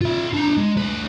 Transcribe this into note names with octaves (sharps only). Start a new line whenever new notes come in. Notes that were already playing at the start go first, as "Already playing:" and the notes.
F4 E5
D4 A#5
G#3
D2 B4